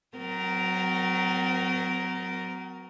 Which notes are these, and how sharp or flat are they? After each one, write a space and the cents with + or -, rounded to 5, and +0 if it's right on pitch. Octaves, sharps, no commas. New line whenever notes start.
F#3 +0 C4 -45 A#4 +0